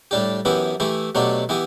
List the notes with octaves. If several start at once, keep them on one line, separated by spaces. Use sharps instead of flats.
A2 G3 D4 G4
F#2 E3 B3 E4 G4
E3 A3 E4 G4
B2 F#3 A3 D4 G4
E3 B3 E4 G4